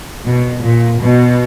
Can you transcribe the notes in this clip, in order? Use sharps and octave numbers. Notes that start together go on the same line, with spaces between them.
B2
A#2
B2